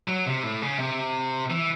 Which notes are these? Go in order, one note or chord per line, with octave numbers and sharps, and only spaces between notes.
F#3
C3
A2
C#3
C3
E3